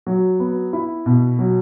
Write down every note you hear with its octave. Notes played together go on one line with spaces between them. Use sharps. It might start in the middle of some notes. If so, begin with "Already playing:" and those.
F#3
B3
E4
B2
F#3